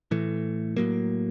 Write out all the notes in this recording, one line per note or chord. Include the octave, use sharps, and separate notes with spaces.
A2 E3 A3
A2 F#3 A#3